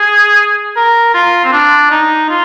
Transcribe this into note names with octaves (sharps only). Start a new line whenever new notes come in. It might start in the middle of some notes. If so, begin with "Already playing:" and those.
Already playing: G#4
A#4
F4
C4
D4
D#4
F4